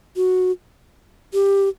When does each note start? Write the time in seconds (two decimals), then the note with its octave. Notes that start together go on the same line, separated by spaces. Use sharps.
0.16 F#4
1.34 G4